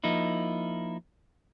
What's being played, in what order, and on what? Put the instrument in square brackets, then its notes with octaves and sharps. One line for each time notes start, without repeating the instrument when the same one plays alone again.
[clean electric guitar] F3 A#3 D#4 E4